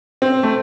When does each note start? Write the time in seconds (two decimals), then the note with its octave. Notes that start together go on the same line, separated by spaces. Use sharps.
0.22 C4
0.43 A3